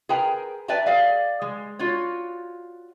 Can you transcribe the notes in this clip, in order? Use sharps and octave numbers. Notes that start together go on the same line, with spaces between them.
G#4 A#4 B4 G5 G#5 A#5
B4 D5 E5 G5 A5 A#5
G#4 D5 F5
G#3
F4 F#4 C#5